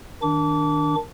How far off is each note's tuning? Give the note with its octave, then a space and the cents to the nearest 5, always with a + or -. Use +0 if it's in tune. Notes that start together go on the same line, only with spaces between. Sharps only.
D#3 +0 D4 +0 D6 -30